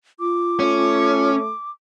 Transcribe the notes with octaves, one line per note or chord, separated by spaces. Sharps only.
F4 D6
A3 C#4